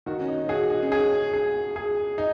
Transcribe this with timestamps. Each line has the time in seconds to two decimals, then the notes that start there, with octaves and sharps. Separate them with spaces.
0.06 D#3 F#4
0.21 C#4
0.28 D#4
0.49 F#4 G#4
0.70 D#4
0.83 C#4
0.92 D#4 G#4
1.33 G#4
1.76 G#4
2.18 D#4